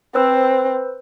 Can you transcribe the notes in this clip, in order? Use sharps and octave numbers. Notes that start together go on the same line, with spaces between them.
C4 B4 C5 E6